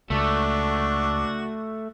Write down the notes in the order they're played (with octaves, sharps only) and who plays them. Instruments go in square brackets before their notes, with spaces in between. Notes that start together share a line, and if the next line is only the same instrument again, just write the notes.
[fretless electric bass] C#2 [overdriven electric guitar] A3 [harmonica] D4 F#4